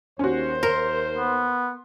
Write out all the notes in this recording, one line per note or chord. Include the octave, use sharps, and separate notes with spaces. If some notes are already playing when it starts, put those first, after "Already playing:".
D#2 C#4 F#4 C5
A#4 C6
B3